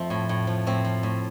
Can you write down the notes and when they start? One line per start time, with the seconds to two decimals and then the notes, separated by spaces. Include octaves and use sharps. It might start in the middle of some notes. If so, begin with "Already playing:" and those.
Already playing: F2 F3 A3 C4
0.10 A2
0.29 A2
0.47 F3
0.67 A2 C4
0.85 F3
1.03 A2